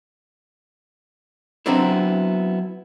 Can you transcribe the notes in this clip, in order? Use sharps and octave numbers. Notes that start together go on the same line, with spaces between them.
F#3 B3 C4 D4 E4